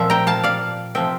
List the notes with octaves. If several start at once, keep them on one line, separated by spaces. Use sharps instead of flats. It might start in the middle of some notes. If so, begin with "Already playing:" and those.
Already playing: A#2 F3 C4 E5
G5 A#5
F5 A5
D5 F5
C3 F3 C4 E5 G5